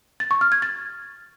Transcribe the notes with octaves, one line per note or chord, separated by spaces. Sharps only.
A6
C#6
F6
G#6
A6